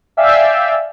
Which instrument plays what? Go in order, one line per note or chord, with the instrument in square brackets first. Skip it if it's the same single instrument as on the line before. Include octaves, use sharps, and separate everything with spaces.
[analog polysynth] D5 E5 F5 G5 G#5 E6